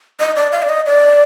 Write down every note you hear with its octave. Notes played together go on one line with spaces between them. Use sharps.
D#5
D5
F5
D5
D#5
D5